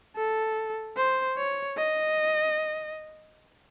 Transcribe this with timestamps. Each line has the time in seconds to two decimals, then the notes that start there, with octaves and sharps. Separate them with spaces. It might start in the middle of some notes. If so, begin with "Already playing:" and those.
0.16 A4
0.97 C5
1.38 C#5
1.78 D#5